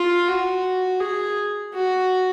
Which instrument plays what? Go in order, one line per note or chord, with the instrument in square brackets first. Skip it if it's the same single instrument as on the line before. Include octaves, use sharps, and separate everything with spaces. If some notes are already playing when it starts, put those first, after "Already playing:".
Already playing: [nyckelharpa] F4
F#4
G#4
F#4